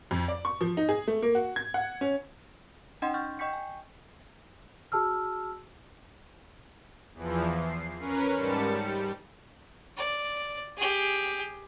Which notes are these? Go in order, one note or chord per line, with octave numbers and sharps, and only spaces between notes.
F2
D5
C#6
F3
D#4
G#4
A3
A#3
F#4
G#6
F#5
C#4
C#4 D#4 D#5 F#5 G5 C6
F#5 C#6 F6 G6 A6
D#5 G5 C#6 G6 B6 C#7
G#5
F#4 G#4 A5 E6 F6
E2 E3 F3
C7
C#4 A#4 B4
G#2 G3 A5 C#7
G3
D5
G4 G#4